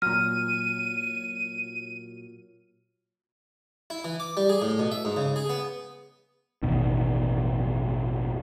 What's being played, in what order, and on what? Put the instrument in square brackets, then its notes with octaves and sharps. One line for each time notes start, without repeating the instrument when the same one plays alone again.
[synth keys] A#2 F#3 [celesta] F6 [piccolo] D#7
[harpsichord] E4
E3
D6
G3
G#4
A2
B2
E5
G#2
C#3
G#4
B3
[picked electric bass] A1 E2 B2 D#3